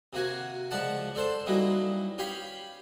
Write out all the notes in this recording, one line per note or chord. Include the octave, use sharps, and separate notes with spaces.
C3 A#3 F#4 G#5
C#2 F3 D5 F#5 A5
D4 A4 C5 A5
E3 F#3 G3 A#3 D#4
C#4 G4 F5 G5 B5